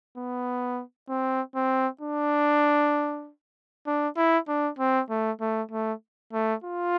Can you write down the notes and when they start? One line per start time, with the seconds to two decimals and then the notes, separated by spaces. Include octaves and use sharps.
0.17 B3
1.09 C4
1.55 C4
2.01 D4
3.87 D4
4.17 E4
4.48 D4
4.79 C4
5.10 A3
5.41 A3
5.71 A3
6.33 A3
6.64 F4